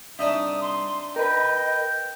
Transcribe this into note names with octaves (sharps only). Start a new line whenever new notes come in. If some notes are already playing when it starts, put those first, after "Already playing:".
C2 D4 D#4 E5 D#6
C6
A#4 B4 D#5 G5